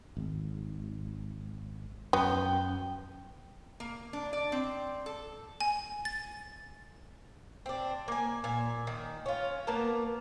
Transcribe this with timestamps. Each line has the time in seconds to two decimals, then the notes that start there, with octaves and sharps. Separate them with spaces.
0.17 G#1
2.13 F#2 F#3 B3 G5
3.80 A#3
4.13 D4
4.33 D5
4.52 C4
5.06 A4
5.61 G#5
6.05 A6
7.66 C4 D4
8.08 A#3 G#5
8.44 A#2 G#5
8.87 D#3
9.26 C#4 F4
9.67 A#3 B3 A#4 A5